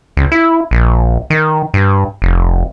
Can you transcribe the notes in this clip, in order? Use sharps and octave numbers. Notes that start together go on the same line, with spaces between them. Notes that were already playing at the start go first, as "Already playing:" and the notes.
C#2
E4
A#1
D#3
G2
F1